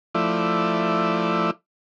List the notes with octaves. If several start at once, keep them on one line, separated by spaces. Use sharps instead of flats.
F3 A3 E4 D5